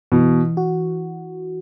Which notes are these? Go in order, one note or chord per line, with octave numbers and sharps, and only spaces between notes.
B2 E3
F#4